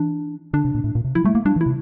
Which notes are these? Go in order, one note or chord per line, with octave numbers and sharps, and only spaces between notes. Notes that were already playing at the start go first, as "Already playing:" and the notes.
Already playing: E3 D4
D3 D4
C3
A#2
A2
A#2
C3
F3 E4
G3 A3
A3 A#3
G3 D4
E3
E4
C3